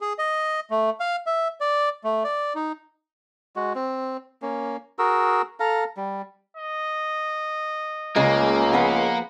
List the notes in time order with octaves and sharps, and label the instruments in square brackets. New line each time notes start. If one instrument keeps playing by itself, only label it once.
[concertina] G#4
D#5
A3
F5
E5
D5
A3
D5
D#4
[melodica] G#3 F#4
C4
A#3 C#4
F#4 G#4 A#4 E6
A4 F5 A#5
G3
[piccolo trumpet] D#5
[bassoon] C#2 [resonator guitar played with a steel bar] C#3 G#3 [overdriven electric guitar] A#3
[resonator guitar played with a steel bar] F3 B3 G#4 [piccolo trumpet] F#5